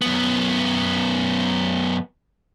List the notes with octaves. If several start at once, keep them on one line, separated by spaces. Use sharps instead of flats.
F#2 B3